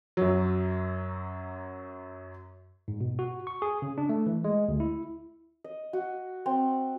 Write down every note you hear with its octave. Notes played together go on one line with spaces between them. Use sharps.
F#2 F#3
G#2
B2
F#4
C#6
G#4
C#3
D4
A3
E3
G#3
D2
E4
D#5
F#4
C4